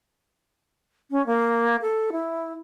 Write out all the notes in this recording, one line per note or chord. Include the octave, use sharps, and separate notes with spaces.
C#4
A#3
A4
E4